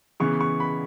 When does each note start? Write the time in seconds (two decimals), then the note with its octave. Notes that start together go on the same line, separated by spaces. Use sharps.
0.20 C#3 E3 B3 C#6
0.41 C#6
0.60 B5